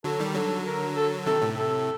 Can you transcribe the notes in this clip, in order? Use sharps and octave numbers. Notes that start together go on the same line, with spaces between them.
D3 F#3 A4
D#3 G3
D3 F#3 A4
A#4
A4
C3 D#3 A4
A2 C3
A4